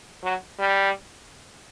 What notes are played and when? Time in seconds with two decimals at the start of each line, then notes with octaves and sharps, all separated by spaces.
0.23 F#3
0.59 G3